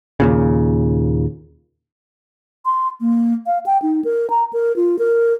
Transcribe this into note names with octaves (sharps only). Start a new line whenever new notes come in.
D#2 A#2 C#3
C6
A#3
F5
G5
D#4
A#4
A#5
A#4
F4
A#4